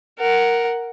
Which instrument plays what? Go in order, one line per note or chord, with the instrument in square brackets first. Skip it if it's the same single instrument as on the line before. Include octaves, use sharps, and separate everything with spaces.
[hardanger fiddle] A#4 F#5